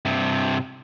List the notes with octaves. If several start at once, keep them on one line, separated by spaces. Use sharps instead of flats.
G2 C3